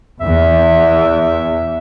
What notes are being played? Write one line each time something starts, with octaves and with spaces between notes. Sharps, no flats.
E2 E5